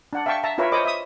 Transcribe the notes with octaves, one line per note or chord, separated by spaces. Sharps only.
D4 F#5
E5 F5 G5 A5 C#6
E5 A5 A#5
E4 F4 A#4 B4 C#5 E5
A#4 C5 C#5 D#5 B5 D6
E5 D#6